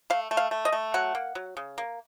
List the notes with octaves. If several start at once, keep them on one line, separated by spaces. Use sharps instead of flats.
A3 F5
A3
F5
A3
D#5
A3
F#3 F#5
A#3
F#3
C#3
A#3